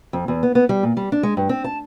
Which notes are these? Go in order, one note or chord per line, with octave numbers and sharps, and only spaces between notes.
F2
E2
B3
B3
G3
A#2
G3
D4
G#3
G2
C4
A5